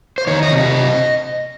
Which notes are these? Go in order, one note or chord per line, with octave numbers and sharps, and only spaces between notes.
C5
D#3 C#5
D#5
C3
D#5